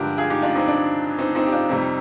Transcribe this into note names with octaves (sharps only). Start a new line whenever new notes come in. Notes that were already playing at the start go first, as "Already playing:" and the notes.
Already playing: G2 D3 F3 G#3 G4 A#4
F4 G#4
D#4 G4
D4 F4
C4 D#4
D4
C4 D#4
C4 D#4
G4
D4 F4
F2 C3 G3 C4 D#4